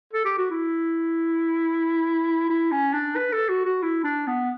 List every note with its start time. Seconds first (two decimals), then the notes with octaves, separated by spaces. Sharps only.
0.13 A4
0.25 G4
0.38 F#4
0.51 E4
2.49 E4
2.71 C#4
2.93 D4
3.16 B4
3.33 A4
3.49 F#4
3.65 F#4
3.82 E4
4.04 D4
4.27 B3